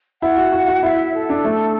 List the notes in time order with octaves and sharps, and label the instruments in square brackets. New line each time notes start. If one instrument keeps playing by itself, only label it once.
[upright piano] E4 [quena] F#5
[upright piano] F#4
F#4
F#4
[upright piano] E4 [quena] F#5
[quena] E5
A4
[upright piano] D4
A3